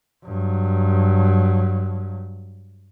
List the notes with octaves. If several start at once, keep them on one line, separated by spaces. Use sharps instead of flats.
G2 F#3